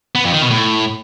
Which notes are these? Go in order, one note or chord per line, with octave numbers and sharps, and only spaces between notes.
B3
F2
D#3
B2
A2